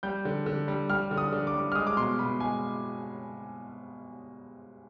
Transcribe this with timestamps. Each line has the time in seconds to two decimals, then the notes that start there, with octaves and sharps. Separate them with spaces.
0.03 G3 G6
0.25 D3
0.46 D3
0.68 G3
0.90 G3 F6
1.11 D3
1.17 D#6
1.32 D3
1.47 D6
1.54 G3
1.72 F6
1.75 G#3 D#6
1.87 D6
1.97 B2 C6
2.19 B2 B5
2.40 G#3 G#5